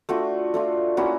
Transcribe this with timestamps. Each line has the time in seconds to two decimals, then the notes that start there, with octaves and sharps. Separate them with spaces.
0.09 A3 D4 F4 F#4
0.54 A3 D4 F4
0.97 A#3 C#4 E4 F#4